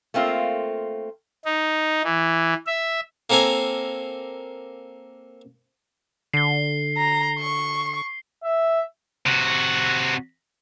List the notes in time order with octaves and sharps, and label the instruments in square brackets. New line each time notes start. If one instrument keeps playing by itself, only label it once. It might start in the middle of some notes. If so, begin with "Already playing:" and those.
[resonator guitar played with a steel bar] A3 A#3 C4 F4
[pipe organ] D#4
E3
E5
[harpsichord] A#3 C4 A4 A#4 G#5
[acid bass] D3 [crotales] C7 G7
[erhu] A#5
C#6
[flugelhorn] E5
[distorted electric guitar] C3 F#4